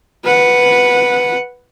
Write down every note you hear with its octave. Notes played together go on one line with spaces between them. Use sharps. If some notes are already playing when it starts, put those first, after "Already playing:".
B4 F#5